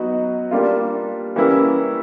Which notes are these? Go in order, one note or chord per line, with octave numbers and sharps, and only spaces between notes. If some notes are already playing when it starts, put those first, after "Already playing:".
Already playing: F#3 B3 D#4 F#4
G3 A#3 D4 F4
E3 G3 A#3 C#4 E4